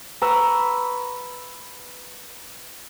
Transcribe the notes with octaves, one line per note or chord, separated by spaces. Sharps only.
B4 A#5 B5 C#6 E6